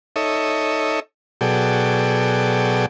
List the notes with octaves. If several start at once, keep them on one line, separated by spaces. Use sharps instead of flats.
D#4 A4 C#5 D#5 E5
B2 F#3 G#4 A4 D5 G5